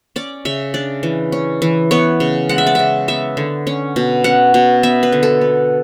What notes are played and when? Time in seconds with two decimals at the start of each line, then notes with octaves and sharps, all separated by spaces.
0.16 C#4 D5
0.45 C#3 E5
0.74 D4 D5
1.03 E3
1.32 C#4
1.62 E3
1.91 B3 C#5
2.20 C#3
2.49 G#3 F#5
2.58 E5
2.67 D5
2.75 C#3 E5
3.08 B3 E5
3.37 D3
3.67 C#4
3.96 B2
4.24 C#4 F#5
4.54 B2
4.83 B3 E5
5.03 B4
5.12 D3
5.23 A4
5.41 B3